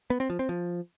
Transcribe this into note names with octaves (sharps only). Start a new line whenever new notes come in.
B3
C4
F3
C4
F3